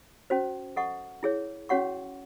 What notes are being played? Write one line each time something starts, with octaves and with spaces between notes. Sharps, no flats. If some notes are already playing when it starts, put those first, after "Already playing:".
C#4 F#4 C5
A4 D#5 F#5 C#6
E4 G#4 C#5
C#4 F#4 C#5 F#5 C#6